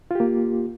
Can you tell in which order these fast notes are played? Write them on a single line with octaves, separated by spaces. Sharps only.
F4 G4 A#3